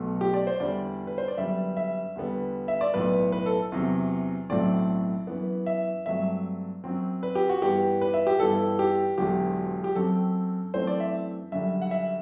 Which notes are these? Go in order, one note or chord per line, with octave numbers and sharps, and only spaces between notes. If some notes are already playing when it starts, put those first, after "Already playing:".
Already playing: B1 B2 A3
G4
D5
C5
E2 D3 G3 D5
B4
C5
D5
F#2 D3 G3 B3 E5
E5
E2 D3 G3 B3
E5
D5
B1 A2 E3 B3 B4
B4
A4
E2 C3 F#3
B1 A2 F#3 A3 C4 D5
F#2 E3 B3
E5
G2 F#3 A3 C4 E5
F#2 F#3 C4
B4
G4
F#4
G2 E3 B3 G4
B4
E5
G4
G2 E3 B3 A4
G4
E1 E2 D3 F#3 G4
G4
F#2 F#3 C4 A4
F#2 E3 A3 C4 C5
D5
E5
F#2 D3 G3 E5
F#5
E5